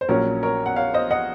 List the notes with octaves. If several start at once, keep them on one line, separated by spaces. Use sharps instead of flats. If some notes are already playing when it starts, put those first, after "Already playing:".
C5
A#1 A#2 F#3 C#4 A#4 C#5
A#4 C#5
F#5
C#5 F5
C5 D#5
D#5 F#5